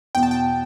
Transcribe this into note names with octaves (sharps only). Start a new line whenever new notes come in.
E2 B2 B3 G5
A5
G5